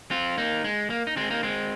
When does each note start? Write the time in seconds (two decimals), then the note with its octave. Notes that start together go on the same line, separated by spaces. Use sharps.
0.11 C4 F4
0.38 A#3 D#4
0.64 G#3
0.90 A#3
1.07 D#4
1.17 G#3 C4
1.30 A#3 D#4
1.43 G#3 C4